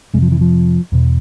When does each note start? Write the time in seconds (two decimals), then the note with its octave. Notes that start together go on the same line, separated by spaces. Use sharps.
0.14 F2 C3 G#3
0.22 F3
0.32 E3
0.41 F3
0.92 E2 B2